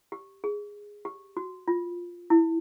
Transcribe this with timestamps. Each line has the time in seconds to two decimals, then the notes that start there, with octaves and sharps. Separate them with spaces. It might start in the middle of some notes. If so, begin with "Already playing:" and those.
0.12 G4
0.44 G#4
1.05 G4
1.37 F#4
1.68 F4
2.30 E4